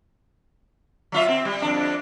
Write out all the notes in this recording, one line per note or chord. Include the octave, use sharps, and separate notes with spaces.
F#3 F4 E5
C4
G3
F2 D4